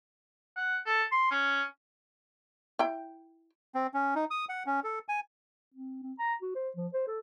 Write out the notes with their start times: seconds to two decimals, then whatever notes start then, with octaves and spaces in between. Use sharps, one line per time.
0.57 F#5
0.86 A4
1.12 C6
1.31 C#4
2.79 E4 G5
3.75 C4
3.94 C#4
4.15 D#4
4.31 D#6
4.49 F#5
4.66 C#4
4.84 A4
5.09 G#5
5.74 C4
6.03 C4
6.18 A#5
6.42 F#4
6.55 C5
6.76 F3
6.93 C5
7.07 A4